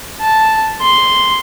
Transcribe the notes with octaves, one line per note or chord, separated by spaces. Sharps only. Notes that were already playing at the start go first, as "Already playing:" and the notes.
A5
C6